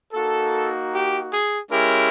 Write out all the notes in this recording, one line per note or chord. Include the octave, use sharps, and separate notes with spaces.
A#3 D#4 F#4 A4
G4
G#4
G#3 C#4 E4 G4 A#4